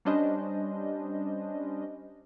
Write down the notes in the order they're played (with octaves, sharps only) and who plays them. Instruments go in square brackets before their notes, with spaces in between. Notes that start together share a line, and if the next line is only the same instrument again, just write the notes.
[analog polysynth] G3 C#4 D4 C5 D#5